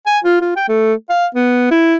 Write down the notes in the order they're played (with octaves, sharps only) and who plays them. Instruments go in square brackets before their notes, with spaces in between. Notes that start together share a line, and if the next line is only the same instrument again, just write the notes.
[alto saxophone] G#5
F4
F4
G5
A3
F5
B3
E4